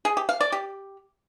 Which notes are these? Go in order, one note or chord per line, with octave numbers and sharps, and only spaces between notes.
G#4
G4
F5
D5
G4